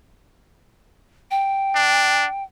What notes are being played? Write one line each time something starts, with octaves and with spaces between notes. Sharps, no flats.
G5
D4